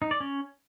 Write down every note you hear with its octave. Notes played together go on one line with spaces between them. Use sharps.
D#4
D5
C#4